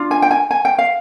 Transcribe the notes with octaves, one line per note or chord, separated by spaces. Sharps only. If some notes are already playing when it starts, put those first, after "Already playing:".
Already playing: D4 F4
G#5
G5
G#5
G#5
G5
F5